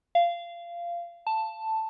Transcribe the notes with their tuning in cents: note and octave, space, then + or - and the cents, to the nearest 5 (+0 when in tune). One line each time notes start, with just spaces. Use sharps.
F5 -20
A5 +5